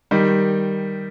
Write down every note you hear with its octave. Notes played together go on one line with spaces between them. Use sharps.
D#3 G3